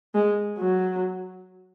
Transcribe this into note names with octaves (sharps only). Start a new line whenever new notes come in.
G#3
F#3